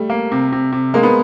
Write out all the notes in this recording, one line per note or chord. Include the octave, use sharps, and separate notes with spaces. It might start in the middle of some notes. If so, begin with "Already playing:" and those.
Already playing: G3 A3
A#3
C3
C3
C3
G#3 A#3
B3